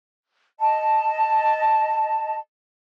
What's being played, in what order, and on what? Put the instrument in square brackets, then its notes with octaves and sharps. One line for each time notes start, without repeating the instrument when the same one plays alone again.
[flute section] D#5 A5